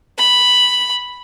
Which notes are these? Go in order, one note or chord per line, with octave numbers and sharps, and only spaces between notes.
B5